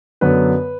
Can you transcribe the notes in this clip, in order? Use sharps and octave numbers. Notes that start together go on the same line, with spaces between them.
F#2 D3 F#3 B3 B4